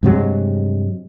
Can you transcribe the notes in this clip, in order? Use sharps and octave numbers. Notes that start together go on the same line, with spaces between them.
G2 C3 F#3 G#3